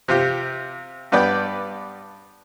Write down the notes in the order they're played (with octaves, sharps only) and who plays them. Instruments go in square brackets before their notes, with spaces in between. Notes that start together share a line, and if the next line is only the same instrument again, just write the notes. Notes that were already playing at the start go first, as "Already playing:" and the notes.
[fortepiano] C3 F4 G4
G2 B3 B4 D5 G5